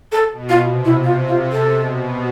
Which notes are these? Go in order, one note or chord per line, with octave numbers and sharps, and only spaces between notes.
A4
B2
F4
C3
E4
C3 F4
F4
C3
A4
B2